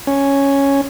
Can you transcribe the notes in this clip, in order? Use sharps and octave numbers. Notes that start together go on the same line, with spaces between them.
C#4